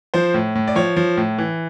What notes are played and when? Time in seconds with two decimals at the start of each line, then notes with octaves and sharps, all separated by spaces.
0.14 F3 C5
0.34 A2
0.55 A2
0.68 D5
0.75 F3 C#5
0.96 F3
1.17 A2
1.38 E3